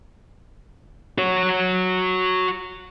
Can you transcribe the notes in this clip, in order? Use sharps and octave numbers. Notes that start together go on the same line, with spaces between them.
F#4 C#5